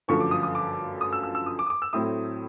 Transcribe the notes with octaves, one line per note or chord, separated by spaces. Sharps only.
G1 F#2 D3 F3 A3 C#6
D6
D#6
D#6
D6
D#6
E6
E6
E6
D#6
D6
D#6
D6
E6
A2 F#3 A3 C4 E4 D#6